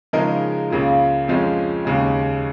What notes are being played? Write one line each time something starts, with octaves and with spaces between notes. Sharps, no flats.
C#3 F3 G#3 D#4 A#4
C#2 C#3 A#3 F4
F2 F3 G#3 C#4
D#2 C#3 G#3